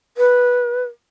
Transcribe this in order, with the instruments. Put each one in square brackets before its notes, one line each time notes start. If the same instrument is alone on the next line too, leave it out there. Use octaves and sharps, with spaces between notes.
[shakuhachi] B4